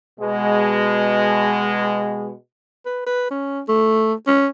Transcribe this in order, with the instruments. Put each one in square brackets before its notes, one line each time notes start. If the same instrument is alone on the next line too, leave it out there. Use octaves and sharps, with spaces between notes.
[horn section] B2 G#3
[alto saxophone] B4
B4
C#4
A3
C#4